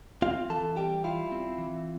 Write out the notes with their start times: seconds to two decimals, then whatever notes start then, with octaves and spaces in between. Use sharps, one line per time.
0.22 C4 F4 F5
0.50 E3 A4 A5
0.76 G3 G4 G5
1.04 E4 F4 F5
1.32 C4
1.58 E3